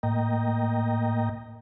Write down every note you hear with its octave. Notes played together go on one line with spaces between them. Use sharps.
A2 A#3 D#5 G5 A#5